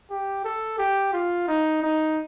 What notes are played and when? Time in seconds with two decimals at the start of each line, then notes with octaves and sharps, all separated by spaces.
0.10 G4
0.44 A4
0.78 G4
1.13 F4
1.48 D#4
1.82 D#4